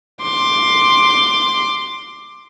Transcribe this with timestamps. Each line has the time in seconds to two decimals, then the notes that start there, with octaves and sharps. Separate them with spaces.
0.22 C6 D6